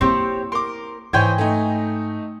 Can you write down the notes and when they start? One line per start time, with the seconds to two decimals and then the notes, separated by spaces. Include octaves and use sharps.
0.01 A#3 C4 E4 G4 C5 C#5
0.52 A#4 C6 D6
1.13 G#2 E3 C5 C#5 D#5 G5 G#5
1.38 A3 D#4